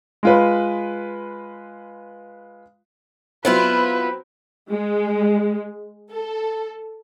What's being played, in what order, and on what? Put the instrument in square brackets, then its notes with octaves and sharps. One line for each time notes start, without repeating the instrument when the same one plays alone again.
[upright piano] G#3 F4 B4
[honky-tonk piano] F#3 C4 [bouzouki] B3 E4 F4 [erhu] B4
[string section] G#3
A4